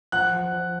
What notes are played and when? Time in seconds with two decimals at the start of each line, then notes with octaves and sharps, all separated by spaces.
0.12 F3 F#5 F#6
0.33 F3
0.52 F3